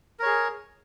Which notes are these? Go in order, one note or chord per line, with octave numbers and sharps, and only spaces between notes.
G#4 A#4 C#5